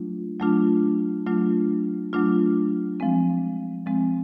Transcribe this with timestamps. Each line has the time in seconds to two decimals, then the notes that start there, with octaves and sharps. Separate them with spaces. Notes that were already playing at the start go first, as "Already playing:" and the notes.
Already playing: F#3 A3 D4 F4
0.40 F#3 A3 D4 F4
1.26 F#3 A3 D4 F4
2.13 F#3 A3 D4 F4
3.00 F3 G#3 C4
3.86 F3 G#3 C4